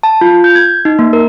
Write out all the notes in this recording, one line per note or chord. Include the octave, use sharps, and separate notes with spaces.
A5
F4
G6
G#6
D#4
A#3
A#4